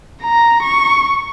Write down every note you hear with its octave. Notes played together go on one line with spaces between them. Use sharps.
A#5
C#6